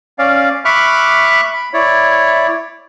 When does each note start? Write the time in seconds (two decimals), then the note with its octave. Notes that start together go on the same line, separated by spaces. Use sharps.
0.19 C#4 D5 F5
0.65 E5 B5 C#6 D6 F6 F#6
1.54 B5
1.73 E4 C#5 D5